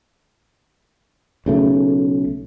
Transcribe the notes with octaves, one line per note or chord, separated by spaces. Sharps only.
B1 C#3 A3